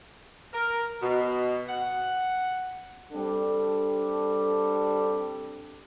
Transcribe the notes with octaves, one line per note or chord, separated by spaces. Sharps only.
A#4
B2
F#5
G3 C4 D4 A4